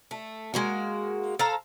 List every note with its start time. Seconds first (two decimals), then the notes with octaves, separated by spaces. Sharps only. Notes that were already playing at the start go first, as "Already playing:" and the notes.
0.11 A3
0.54 G#3 A#3 F#4
1.39 A4 C5 F5 A#5